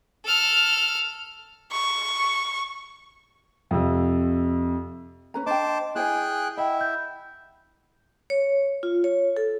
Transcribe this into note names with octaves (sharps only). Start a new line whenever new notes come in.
A4 F6
C#6
F2 C3
C#4 B4 A#5
D4 C5 D#5 G5 A5 D6
E4 G#4 C5 G5 G#5 F#6
E4 D#5 F#5 G5
G6
C#5
F4
C#5
A4